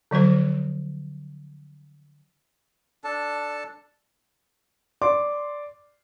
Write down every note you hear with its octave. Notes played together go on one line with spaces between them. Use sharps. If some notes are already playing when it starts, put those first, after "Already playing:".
D3 F3 F#3 C5
D4 A4 A5
D5 C6 D6